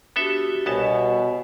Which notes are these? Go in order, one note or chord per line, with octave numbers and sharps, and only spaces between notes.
B3 D4 F#4 G4 A4 E5
C2 B2 B3 C#5 G#5 A5 B5